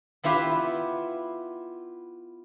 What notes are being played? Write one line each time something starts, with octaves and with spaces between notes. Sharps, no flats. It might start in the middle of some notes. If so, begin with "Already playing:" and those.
B3 E4 F4 G4 B4 E5